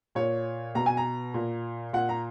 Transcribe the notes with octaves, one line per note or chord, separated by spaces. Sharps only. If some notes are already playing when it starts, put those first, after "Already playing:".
A#2 C#5
B2 A#5
G#5
A#5
A#2
A#2 F#5
A#5